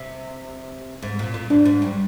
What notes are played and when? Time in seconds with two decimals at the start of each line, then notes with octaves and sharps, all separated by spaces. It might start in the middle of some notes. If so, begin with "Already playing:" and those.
Already playing: C3
1.02 G#2
1.19 A#2
1.34 A#2
1.50 G#2 D4
1.65 G#2
1.82 G2